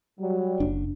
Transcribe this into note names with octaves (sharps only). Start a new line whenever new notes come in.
F#3 G3
F#1 D4